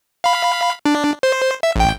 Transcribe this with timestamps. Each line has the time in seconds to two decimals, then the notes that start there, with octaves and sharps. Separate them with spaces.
0.24 F5 B5
0.85 D4
1.23 C5
1.63 E5
1.76 A1 G5